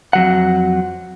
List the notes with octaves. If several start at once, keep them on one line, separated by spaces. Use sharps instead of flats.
F2 F#3 F#5